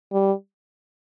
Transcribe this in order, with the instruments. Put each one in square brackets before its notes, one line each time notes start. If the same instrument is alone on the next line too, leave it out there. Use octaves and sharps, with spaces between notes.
[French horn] G3